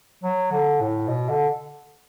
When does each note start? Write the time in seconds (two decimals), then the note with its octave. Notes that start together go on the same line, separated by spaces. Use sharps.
0.24 F#3
0.52 D3
0.81 A2
1.08 B2
1.29 D3